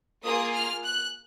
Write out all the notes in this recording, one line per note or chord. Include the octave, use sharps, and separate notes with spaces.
A#3 F4 G#4 D#6
F6
F#6